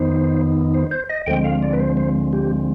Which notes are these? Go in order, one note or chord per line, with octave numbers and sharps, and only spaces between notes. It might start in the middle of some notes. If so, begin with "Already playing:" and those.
Already playing: F2 D#3 B3 D#4 C5
C5
C5
D#5
D2 D3 F3 G#3 C4 G5
F5
D5
B4
C5
C5
G4